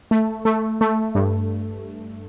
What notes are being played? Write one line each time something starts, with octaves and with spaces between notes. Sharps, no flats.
A3
A3
A3
G2